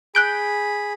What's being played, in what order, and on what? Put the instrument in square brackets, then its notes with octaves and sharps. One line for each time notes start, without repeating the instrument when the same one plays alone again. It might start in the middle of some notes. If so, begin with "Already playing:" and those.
[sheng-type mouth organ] G#4 B5 [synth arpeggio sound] F#6 G6 D7